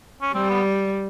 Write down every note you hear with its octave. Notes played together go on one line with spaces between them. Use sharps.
C#4
G3 C4
B3